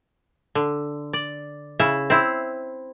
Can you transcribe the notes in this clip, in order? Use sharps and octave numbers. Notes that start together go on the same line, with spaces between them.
D3
D5
C#3 E4
C4 E4